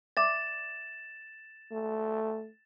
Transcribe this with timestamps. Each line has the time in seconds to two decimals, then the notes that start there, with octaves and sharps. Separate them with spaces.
0.17 D5 E5 D6 A6 E7
1.72 A3